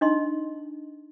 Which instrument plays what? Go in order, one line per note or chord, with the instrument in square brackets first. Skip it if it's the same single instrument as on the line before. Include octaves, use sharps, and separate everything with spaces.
[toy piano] D4 D#4 D#5 C6